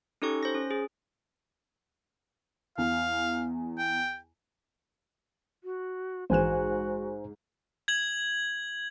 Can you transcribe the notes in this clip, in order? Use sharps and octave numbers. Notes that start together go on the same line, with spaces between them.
C#4 D#4 G4 A4 C#6
C5 A#6
C#4
G#4
E2 F5
G5
F#4
A#1 G#2 E3 F#4 C5 G#5 F#6 E7
G#6 F#7